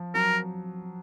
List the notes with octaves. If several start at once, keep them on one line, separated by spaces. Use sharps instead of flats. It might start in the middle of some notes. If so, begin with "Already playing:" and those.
Already playing: F3
F#3 A#4